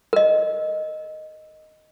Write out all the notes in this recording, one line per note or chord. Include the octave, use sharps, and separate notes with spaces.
A#4 D#5